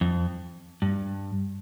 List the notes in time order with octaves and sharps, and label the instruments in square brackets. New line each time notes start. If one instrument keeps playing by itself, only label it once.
[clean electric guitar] F2
G2